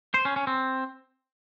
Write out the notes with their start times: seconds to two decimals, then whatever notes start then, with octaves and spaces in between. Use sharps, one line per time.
0.14 C5
0.25 C#4
0.36 C#4
0.47 C4